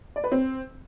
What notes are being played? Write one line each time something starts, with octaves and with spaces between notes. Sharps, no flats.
D5
B4
C4